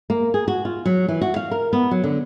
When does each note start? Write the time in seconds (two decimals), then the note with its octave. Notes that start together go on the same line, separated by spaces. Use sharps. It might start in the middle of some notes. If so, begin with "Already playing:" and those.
0.10 A#3
0.34 G#4
0.48 F#4
0.65 F4
0.86 F#3
1.08 E3
1.21 F#4
1.36 F5
1.51 A#4
1.73 B3
1.91 F#3
2.04 D3